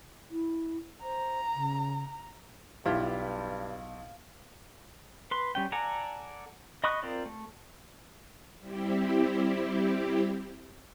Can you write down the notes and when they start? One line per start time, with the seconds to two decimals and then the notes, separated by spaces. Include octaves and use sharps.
0.30 E4
1.03 C5 A#5
1.54 C#3
2.86 B1 G2 E4 F4 G4 F5
5.31 B4 C6
5.55 G3 C#4 G5
5.72 A4 D5 F#5 G#5 A#5
6.84 D#5 B5 C#6 D#6 F#6
7.02 C4 F4 A#4 C5 D5
7.26 A3
8.60 G3 C4 E4 G4